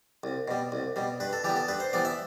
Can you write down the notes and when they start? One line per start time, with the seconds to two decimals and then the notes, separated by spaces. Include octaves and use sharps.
0.24 C2
0.48 B2 G3
0.72 C2
0.96 B2 G3
1.20 G2 B4
1.33 A4
1.44 E3 G3 B3 G4
1.56 A4
1.68 G2 B4
1.80 C5
1.93 E3 G3 B3 D5
2.05 E5